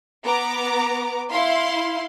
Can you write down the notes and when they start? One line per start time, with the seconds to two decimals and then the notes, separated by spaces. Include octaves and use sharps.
0.23 B3 A#5 D6
1.31 E4 F5 C6